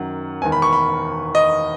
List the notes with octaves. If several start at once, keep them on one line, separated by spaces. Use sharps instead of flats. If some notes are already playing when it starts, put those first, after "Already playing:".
Already playing: F#2 D#3 F#3 F#5
E1 E2 D#3 G#5
B5
C#6
B5
D#5